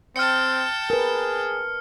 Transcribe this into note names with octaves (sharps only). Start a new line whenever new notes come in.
C4 G5 A5 F6 C#7
G#4 A#4 B4